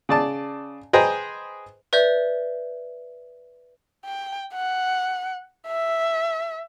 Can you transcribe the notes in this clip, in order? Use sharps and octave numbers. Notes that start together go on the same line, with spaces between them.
C#3 D5 A5
G#4 B4 C5 D#5 G5 A#5
B4 D5 E5 G6
G5
F#5
E5